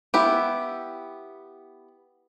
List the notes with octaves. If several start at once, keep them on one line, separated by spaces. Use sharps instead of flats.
B3 E4 G4